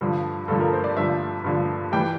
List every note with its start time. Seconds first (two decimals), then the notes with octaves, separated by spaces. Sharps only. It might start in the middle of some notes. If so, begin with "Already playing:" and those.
0.01 G2 D3 F3
0.48 G2 D3 F3 A4
0.60 A#4
0.73 C5
0.84 D5
0.96 G2 D3 F3 E5
1.44 G2 D3 F3
1.92 E3 G3 G5